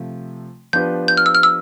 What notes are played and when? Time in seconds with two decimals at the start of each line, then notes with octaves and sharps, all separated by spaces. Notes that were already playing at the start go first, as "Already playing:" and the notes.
Already playing: C3 F3 A3
0.73 F3 B3 D4 G4 B4 G6
1.08 G6
1.17 F6
1.26 E6
1.35 F6
1.43 E6